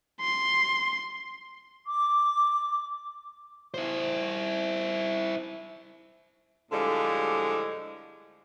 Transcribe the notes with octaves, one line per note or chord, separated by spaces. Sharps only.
C6
D6
E4 C5
A2 D3 F3 G3 G#3